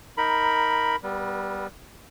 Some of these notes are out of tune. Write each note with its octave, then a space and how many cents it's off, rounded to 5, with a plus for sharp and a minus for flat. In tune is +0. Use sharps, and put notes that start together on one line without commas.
D#4 +10 A#4 +0 B5 +0
G3 +0 B3 +0 B4 -45